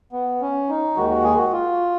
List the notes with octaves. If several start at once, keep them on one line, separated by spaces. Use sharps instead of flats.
B3
C#4
D#4
D#2 D#3 G#3 F#4
F#4
G#4
F#4
F4